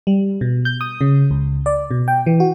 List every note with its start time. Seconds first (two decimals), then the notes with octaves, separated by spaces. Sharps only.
0.07 G3
0.41 B2
0.65 G6
0.81 D#6
1.01 C#3
1.31 C#2
1.66 D5
1.91 B2
2.08 G5
2.26 E3
2.40 F#4